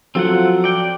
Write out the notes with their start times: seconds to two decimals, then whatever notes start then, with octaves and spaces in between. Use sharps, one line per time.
0.15 F3 F#3 C4 F4 A4 F#5
0.64 D5 G5